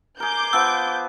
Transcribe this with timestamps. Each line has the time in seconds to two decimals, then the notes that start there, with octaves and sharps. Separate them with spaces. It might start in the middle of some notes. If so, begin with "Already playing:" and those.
0.20 G#4 A#4 D6 G6
0.53 F3 B3 E6